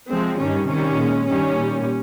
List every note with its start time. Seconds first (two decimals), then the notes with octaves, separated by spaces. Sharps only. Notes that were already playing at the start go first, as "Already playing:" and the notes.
0.11 C3 F3 G#3 C4
0.40 G2 D#3 G3 C#4
0.69 C3 D#3 G3 C#4
0.98 A#2 G#3
1.27 G2 D#3 G3 C#4
1.56 A#2 G3